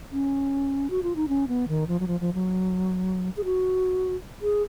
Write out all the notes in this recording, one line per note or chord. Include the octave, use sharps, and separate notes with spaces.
C#4
F#4
F4
D#4
C#4
B3
D#3
F3
F#3
F3
F3
F#3
G#4
F#4
G#4